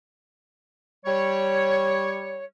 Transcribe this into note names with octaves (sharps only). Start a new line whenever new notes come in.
G3 C#5